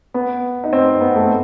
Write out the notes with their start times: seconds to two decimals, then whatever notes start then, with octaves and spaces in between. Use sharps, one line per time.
0.14 B3
0.64 D#4
0.73 C4
1.01 B3
1.16 A3